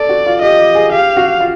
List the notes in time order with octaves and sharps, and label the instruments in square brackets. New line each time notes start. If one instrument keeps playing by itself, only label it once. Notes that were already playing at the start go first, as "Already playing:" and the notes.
Already playing: [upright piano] A4 [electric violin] D5
[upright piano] F#4
F4
[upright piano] G4 [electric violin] D#5
[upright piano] G4
G#4
[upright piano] G4 [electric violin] F5
[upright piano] F#4
F4